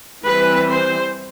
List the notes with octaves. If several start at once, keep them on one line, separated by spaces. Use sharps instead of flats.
E3 G3 C4 B4
C5